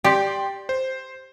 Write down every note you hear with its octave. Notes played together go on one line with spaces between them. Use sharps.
G4 D5 G5 C6
C5